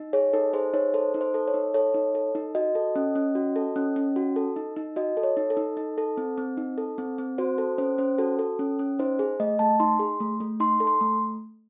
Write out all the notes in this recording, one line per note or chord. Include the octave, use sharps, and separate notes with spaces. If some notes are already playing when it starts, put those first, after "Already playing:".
Already playing: D#4
G#4 C#5
D#4 A4
G#4 C5
D#4 C#5
A4 C5
D#4
C5
A4
C#5
D#4
A4 C#5
D#4
A4
D#4
F#4 D#5
A4
C#4
C#4
F#4
A4
C#4
C#4
F#4
A4
D#4
D#4
F#4 D#5
A4
C#5
D#4
A4
D#4
D#4
A4
C4
C4
D#4
A4
C4
C4
F#4 C5
A4
C#4 C5
C#4 C5
F#4 A4
A4
C#4
C#4
D#4 C5
G#4
A3 D#5
A3 A5
D#4 C6
G#4
A3
A3
D#4 C6
A4
C6
A3